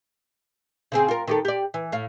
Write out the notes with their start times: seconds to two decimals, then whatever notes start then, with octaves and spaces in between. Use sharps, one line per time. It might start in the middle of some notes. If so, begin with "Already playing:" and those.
0.92 C#3 C4 G#4
1.08 F4 A#4
1.28 D#3 G4 A4
1.45 G4 D5
1.74 E3
1.92 A2 F5